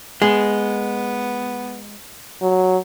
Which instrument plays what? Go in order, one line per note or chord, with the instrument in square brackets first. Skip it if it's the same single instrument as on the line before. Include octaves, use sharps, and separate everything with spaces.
[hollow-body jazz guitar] G#3 [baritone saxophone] B3
[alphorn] F#3